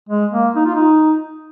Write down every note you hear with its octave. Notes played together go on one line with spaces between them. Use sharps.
G#3
A#3
D#4
F4
D#4